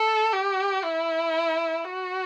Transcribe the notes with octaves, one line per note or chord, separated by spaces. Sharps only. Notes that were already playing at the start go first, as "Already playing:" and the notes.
Already playing: A4
G4
E4
F#4